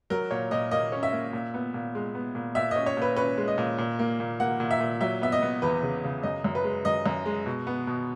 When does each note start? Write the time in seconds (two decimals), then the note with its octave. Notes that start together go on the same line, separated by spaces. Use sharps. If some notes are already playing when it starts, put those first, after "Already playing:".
0.10 F#3 A#4
0.31 A#2 C#5
0.51 A#2 D#5
0.71 A#3 D#5
0.92 C#4
1.03 E5
1.13 A#3
1.33 A#2
1.54 B3
1.74 A#2
1.95 G#3
2.15 B3
2.35 A#2
2.55 A#2 E5
2.71 C#4 D#5
2.86 C#5
2.97 A#2 B4
3.16 C#4 B4
3.37 G#3
3.48 D#5
3.58 A#2
3.78 A#2
3.99 A#3
4.20 A#2
4.40 A#3 F#5
4.60 A#2
4.71 E5
4.80 A#2
5.01 F#3 E5
5.22 B3 E5
5.32 D#5
5.42 B3
5.62 E2 B4
5.83 C#3
6.04 C#3
6.23 F#2 D#5
6.44 F#2
6.55 B4
6.64 G#3
6.85 F#2 D#5
7.06 F#2
7.26 G#3
7.46 B2
7.67 B3
7.87 B2